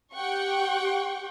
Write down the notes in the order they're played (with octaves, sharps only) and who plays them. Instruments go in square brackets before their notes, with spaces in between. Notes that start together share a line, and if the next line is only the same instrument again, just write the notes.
[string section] G4 F#5 G5 C#6